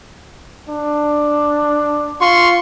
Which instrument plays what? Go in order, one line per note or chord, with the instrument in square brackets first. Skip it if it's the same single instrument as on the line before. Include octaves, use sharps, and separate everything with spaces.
[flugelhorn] D4
[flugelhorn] F4 [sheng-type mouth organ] C6 C#6